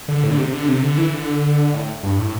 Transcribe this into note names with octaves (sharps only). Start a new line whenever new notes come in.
D3
A2
D3
C3
D3
C3
D3
E3
D3
A2
G2
A2